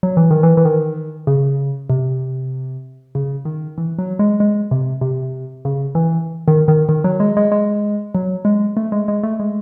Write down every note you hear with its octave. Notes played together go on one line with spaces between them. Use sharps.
F#3
E3
D#3
E3
E3
D#3
C#3
C3
C#3
D#3
E3
F#3
G#3
G#3
C3
C3
C#3
E3
D#3
D#3
D#3
F#3
G#3
G#3
G#3
F#3
G#3
A3
G#3
G#3
A3
G#3